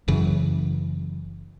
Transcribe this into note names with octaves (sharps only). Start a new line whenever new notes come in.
F#1 F#2 C#3 E3